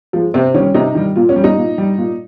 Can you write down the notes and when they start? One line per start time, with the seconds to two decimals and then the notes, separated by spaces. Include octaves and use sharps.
0.13 F3 G#3
0.34 C3 C4
0.54 D#3 G3 C#4
0.74 C3 D#4
0.95 D#3 G3
1.16 A#2 F4
1.29 C#4
1.36 G3
1.44 D#4
1.57 A#2
1.78 G3
1.98 A#2